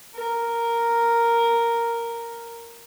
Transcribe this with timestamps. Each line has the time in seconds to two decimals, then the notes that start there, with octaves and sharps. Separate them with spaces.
0.15 A#4